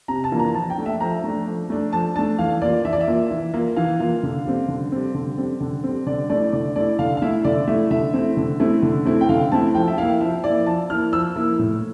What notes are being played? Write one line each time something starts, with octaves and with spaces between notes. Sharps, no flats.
C3 A#5
A5
E3 A#3 D4 F4
A#5
F3 A5
G5
A3 D4
E5
F3 A#5
A3 D4
F3
A3 D4
F3 A5
A3 D4 A5
E3 F5
A#3 F4 D5
E3 E5
D5
E5
A#3 F4
E3
A#3 F4
E3 F5
A#3 F4
D3
G3 C4
D3
G3 C4
D3
G3 C4
D3
G3 C4
D3 D5
A3 E4 D5
D3 D5
A3 E4 D5
D3 F5
F5
A3 E4 E5
D3 D5
A3 E4 E5
D3 E5
A3 C4 E4
D3
A3 C4 E4
D3
A3 C4 E4
G5
D3 F5
A3 C4 E4 A5
F3 G5
E5
A#3 E4 F5
F3 E5
A#3 E4 D5
F3 A5
A#3 E4 F6
F3 E6
A#3 E4
A2